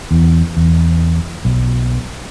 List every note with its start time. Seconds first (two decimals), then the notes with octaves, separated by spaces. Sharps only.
0.11 E2
0.57 E2
1.45 B1